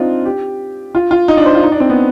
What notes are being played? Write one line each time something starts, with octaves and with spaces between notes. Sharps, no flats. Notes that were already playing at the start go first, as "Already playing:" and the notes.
Already playing: C4 D4 D#4 F4
G4
F4
F4
D#4
D4
C5
F4
D#4
D4
C4
B3